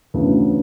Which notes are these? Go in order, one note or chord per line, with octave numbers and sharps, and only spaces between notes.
D2 C#3 E3 B3